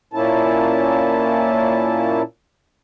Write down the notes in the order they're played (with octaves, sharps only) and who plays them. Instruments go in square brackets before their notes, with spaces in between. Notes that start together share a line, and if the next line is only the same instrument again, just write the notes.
[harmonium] A#2 A#3 C#4 E4 A5